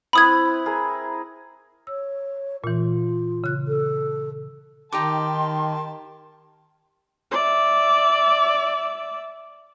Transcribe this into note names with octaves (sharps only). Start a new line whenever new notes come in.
C4 E4 B4 B5 D#6 G#6
G#4 A#4
C#5 E6
A#2 E3 F4
C#3 F#6
A4
D#3 D#4 G4 G5 A5 C6 D6
D5 E5